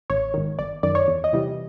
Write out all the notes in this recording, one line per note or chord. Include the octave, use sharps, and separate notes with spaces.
A1 C#5
G#2 D#3
G1 D5
F#2 D#3 D5
C#5
E2
D#5
C3 E3 G3